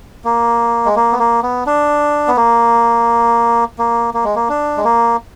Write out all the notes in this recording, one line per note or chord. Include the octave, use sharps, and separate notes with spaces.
A#3
G#3
A#3
B3
A#3
B3
D4
B3
A#3
A#3
A#3
G#3
A#3
D4
G#3
A#3